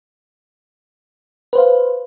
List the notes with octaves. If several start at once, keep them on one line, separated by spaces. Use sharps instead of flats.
B4 C5 F5